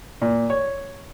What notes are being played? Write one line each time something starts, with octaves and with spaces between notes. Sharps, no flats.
A#2
C#5